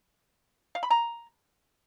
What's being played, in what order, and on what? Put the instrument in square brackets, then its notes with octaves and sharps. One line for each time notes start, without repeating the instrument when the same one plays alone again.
[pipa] F5
B5
A#5